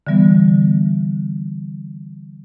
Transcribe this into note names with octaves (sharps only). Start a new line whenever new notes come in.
D3 E3 G3 B3